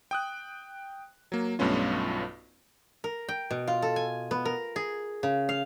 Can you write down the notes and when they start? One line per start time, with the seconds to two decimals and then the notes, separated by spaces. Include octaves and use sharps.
0.11 G5 D#6 F#6
1.32 F#3 A#3
1.59 B1 G2 A3 B3 C#4 F4
3.04 A#4
3.29 G5
3.50 B2
3.68 F4
3.82 A4
3.96 G#5
4.31 B3
4.45 A#4
4.76 G#4
5.23 C#3
5.49 F5